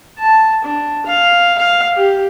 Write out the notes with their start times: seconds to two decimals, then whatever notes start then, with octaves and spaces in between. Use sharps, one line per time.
0.19 A5
0.64 D4
1.06 F5
1.58 F5
1.97 G4